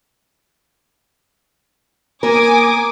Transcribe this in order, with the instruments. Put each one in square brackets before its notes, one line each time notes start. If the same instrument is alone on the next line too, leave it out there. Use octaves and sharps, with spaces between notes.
[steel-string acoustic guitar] A#3 A#4 [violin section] G#5 D6 D#6